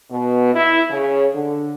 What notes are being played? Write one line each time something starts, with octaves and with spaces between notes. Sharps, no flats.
B2
E4
C#3
D3